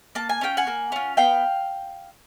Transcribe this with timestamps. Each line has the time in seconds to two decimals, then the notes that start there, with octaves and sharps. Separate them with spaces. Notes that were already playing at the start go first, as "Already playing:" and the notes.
0.15 A#3 A5
0.29 G#5
0.41 C#4 F4 G5
0.57 F#5 G#5
0.67 A#3
0.92 C#4 F4
1.17 B3 F5 G5